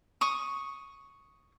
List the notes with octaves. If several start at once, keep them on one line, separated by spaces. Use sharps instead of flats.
C#6 D#6